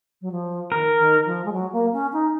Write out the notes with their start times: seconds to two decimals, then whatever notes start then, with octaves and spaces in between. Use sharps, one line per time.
0.21 F#3
0.31 F3
0.72 D#3 A#4
0.99 D#3
1.25 F3
1.45 G#3
1.52 F#3
1.72 A#3
1.93 C#4
2.13 D#4